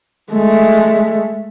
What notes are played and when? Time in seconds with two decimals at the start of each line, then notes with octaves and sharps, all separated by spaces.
0.32 G#3 A3